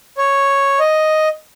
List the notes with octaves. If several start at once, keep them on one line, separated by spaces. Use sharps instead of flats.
C#5
D#5